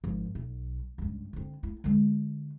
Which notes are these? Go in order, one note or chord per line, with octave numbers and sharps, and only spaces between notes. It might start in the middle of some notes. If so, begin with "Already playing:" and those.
G#1 F3
B1
C#2 G2
D3 C4
A3 E4
D3 G#3